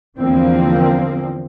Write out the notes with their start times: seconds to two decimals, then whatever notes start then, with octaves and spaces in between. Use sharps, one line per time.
0.18 E2 D3 F3 A#3 C4